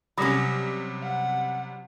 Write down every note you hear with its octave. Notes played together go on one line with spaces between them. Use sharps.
C3 F#3 G3 C#4 B5 D6 D#6 A#6
F#5